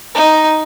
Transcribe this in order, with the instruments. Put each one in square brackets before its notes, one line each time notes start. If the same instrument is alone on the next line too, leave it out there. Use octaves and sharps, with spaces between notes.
[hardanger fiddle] D#4